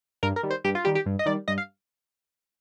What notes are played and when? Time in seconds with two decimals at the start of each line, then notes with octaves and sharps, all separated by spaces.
0.23 G2 A#4
0.36 A#4
0.43 D#3 G3
0.51 C5
0.65 G2 G4
0.75 F4
0.85 D#3 G3 G4
0.95 G4
1.06 G2
1.19 D#5
1.26 D#3 G3 D5
1.48 G2 D#5
1.58 F5